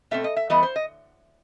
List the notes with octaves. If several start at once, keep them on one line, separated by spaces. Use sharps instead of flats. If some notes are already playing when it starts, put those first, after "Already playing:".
B2 A3 C4 E5
D#5
E5
E3 G3 B3 D#5
C5
D#5